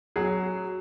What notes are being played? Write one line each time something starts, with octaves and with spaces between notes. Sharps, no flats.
F#3 G#4